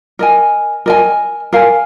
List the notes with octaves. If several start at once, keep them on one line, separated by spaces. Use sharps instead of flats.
A#4 D#5 G#5
A#4 D#5 G#5
A#4 F5 G#5